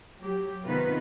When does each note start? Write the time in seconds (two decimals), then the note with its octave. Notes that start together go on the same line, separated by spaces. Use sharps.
0.20 F#3 G4
0.66 C3 D#3 B3 D#4 F4 B4